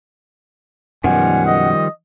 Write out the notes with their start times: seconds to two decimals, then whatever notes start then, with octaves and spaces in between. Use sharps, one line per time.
1.04 F#2 B2 D#3 F3 G3 F#5 G#5
1.46 D#5